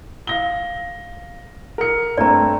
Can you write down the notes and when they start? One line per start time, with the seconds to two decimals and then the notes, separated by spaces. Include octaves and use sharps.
0.27 F5 A#6 G7
1.78 A#4 C#7
2.18 G2 A3 C4 D5 A#5